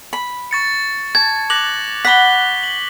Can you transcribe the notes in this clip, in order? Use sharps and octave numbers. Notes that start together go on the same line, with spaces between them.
B5
C#6 A6 C#7
A5 G#6
D6 F#6 A#6 F#7
F#5 B5 A#6 B6 G7
F#7